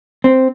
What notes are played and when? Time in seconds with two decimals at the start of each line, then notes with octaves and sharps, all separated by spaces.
0.24 C4